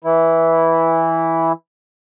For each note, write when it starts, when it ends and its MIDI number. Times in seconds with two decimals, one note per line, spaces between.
0.04 1.52 52
0.04 1.52 64